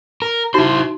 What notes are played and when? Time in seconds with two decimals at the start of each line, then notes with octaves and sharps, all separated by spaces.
0.22 A#4
0.54 D#4 E4 F#4 C5 C6